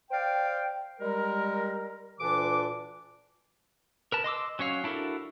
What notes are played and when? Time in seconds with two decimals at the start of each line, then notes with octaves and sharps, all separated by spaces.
0.11 C5 D5 F5 G5
1.00 G3 G#3 A#4
2.20 D2 A#2 E3 D4 D6
4.12 A#4 B4 A5
4.24 D#5 C6 D6 E6
4.59 F#3 C#4 C#5 F5
4.84 D4 E4 F#4 A4 A#4